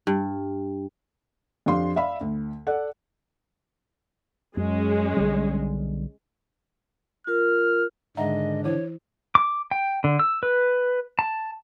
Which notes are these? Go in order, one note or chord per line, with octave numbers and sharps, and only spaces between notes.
G2
F2 D4 G4 F5 C6
D5 E5 F5 B5
D2
A4 D5 F#5
F#2 G#3 C#4
B1 D3 G3
F4 A#4 F6
G#2 D3 D#3 D4 D#5 E5 F#5 A#5
E3 E4 C5 C#5
D6
G5
D3
E6
B4
A5